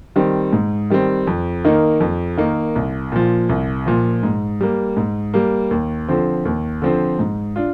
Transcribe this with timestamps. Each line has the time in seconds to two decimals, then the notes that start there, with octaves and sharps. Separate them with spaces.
0.16 D#3 G3 C4
0.53 G#2
0.90 D#3 G3 C4
1.27 F2
1.65 D#3 A#3 D#4
2.00 F2
2.38 D#3 A#3 D#4
2.76 C2
3.12 A#2 F3
3.49 C2
3.86 A#2 F3
4.23 G#2
4.60 G3 A#3
4.97 G#2
5.34 G3 A#3
5.71 D#2
6.08 D3 F3 C4
6.45 D#2
6.82 D3 F3 C4
7.19 G#2
7.56 D4 F4